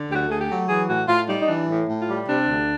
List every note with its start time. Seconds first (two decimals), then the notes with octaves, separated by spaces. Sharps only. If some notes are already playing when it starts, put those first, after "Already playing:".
Already playing: D3
0.08 D2 G4
0.15 F#4
0.28 A3 G#4
0.41 G4
0.49 F#3
0.68 E3 G#4
0.88 A2 F#4
1.07 A2 F4
1.28 G3 D#4
1.42 D#4
1.48 E3 D4
1.68 A2
1.88 A2
2.01 F4
2.07 G3
2.27 C3 D4
2.47 D2